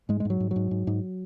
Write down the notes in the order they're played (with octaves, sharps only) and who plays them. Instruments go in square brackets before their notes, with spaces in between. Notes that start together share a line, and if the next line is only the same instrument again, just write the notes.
[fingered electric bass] G#2 G#3
G#3
G#2
F#3
G#2
G#2 F#3
G#2
G#2